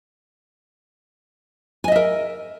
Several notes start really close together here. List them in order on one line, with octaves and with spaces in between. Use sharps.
G#5 D#5 E5 A#4